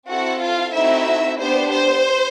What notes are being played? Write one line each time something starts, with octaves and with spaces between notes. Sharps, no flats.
C4 E4 F#4 A4 F#5
F4 F5
A3 C4 D#4 E4 F#4 E5
B3 D4 G4 C5
C5